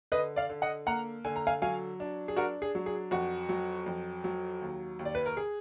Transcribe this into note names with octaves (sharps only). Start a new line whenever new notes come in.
D3 B4 D#5
D5 F5
D3
D#5 F#5
A#3 F#5 A#5
D3 G#5
A#5
F5 G#5
F#3 F5 G#5
D4
G#4
D4 F#4 A#4
G#4
F#3
G#4
F2 F#4
F#3
F2
F#3
D#2
D#2
D5
B4
A#4
G#4